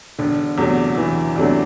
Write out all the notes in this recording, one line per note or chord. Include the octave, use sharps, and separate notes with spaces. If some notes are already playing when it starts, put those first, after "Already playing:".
E1 D3
E2 C3 F#3 A3
E1 E3
E2 C3 F#3 A3 D4